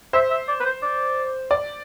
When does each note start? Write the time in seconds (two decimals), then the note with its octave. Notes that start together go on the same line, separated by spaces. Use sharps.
0.13 C5 E5
0.30 E5
0.48 D5
0.60 B4
0.65 C5
0.82 D5
1.51 D5